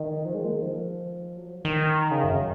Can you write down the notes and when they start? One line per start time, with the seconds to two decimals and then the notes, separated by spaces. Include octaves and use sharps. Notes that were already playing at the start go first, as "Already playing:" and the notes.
Already playing: D#3
0.25 F3
0.35 G#3
0.45 A#3
0.53 D#3
0.62 F3
1.37 F#3
1.46 F3
1.65 D#3
2.11 C#3
2.24 F#2